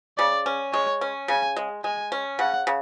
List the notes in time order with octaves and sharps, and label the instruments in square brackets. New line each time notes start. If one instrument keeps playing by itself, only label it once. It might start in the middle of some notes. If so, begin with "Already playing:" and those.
[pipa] C#3 [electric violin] D5
[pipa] C#4
[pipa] G#3 [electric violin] C#5
[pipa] C#4
[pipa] C#3 [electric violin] G#5
[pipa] G#3
[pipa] G#3 [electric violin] G#5
[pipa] C#4
[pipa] C#3 [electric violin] F#5
[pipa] C#3